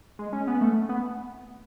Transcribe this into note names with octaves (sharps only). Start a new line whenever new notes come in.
G#3
C#4
B3
A3
B3